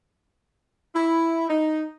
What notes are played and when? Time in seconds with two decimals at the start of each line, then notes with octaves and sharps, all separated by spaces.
0.95 E4
1.49 D#4